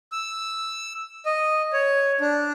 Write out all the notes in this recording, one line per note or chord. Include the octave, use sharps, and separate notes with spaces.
E6
D#5
C#5
D4